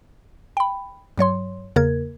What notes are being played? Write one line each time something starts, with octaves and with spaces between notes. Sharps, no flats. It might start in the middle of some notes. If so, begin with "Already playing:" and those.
G5 B5
G2 F#3 C#5 C6
E2 C#3 A#3 A#4 G#6